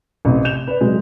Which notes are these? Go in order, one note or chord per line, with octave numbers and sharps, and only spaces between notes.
A1 C3
G6 E7 F7 G7
B4 D5
C3 F#3 G#3